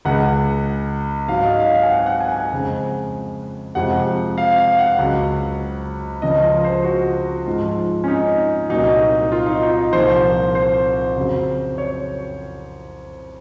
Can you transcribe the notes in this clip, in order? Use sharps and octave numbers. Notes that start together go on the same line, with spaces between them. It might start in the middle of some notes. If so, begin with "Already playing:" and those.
C#2 C#3 G#3 F#5
G#2 F#3 F5
D#5
F5
F5
G#5
F#5
F#5
G#5
G#5
F2 C#3 G#3
F2 C3 F3 G#3 F#5
F5
F5
F#5
C#2 C#3 F#3
C#2 C#3 F3 G#3 D#5
F4
C5
F#4
G#2 F3 G#3 F4
C#4
D#4
C2 A#2 F#3 D#4
F4
D#4
D#4
C2 A#2 F3 C5
C5
F2 C#3 F#3
C#5